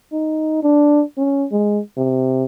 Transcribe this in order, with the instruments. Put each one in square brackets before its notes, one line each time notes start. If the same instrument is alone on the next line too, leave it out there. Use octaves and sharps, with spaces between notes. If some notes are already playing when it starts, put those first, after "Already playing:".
[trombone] D#4
D4
C#4
G#3
C3